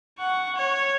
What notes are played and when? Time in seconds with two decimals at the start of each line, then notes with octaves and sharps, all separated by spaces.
0.19 F#5 C#6
0.56 C#5